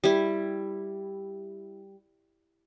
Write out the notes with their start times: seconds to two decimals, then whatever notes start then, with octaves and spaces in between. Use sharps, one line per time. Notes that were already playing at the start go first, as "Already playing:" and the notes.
0.04 G3 E4